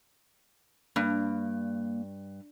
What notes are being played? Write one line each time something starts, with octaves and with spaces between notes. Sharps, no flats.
G2 A#3